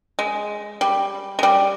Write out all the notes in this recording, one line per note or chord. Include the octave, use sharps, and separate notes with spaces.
G#3
G3
G#3
G3